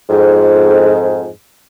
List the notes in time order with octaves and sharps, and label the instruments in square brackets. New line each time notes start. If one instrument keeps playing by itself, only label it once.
[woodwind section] F2 G#2